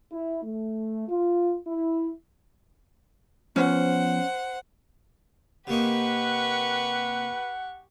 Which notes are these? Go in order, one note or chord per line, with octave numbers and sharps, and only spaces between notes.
E4
A3
F4
E4
F3 B3 C#4 C5 F#5
C3 A#3 D#4 G4 B4 F#5 C#6